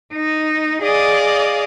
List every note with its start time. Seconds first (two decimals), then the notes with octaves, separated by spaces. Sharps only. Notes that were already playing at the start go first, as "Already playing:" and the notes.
0.12 D#4
0.83 G#4 D5 D#5 F5